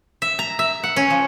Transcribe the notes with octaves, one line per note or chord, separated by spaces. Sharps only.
E5
A#5
E5
F#5
C#4
F3